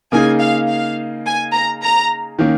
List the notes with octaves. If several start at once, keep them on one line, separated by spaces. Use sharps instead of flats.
C#3 A#3 D#4 G#4 G#5
F5
F5
G#5
A#5
A#5
D#3 A#3 C#4